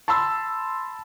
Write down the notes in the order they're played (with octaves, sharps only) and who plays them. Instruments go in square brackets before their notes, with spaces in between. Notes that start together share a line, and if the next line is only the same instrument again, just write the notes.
[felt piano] A5 B5 C6 E6